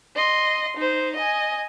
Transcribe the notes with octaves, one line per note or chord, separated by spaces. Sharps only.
D#5 C6
D#4 C5
D#5 G#5